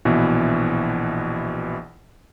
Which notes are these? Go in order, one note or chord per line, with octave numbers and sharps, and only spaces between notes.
A#1 B2 E3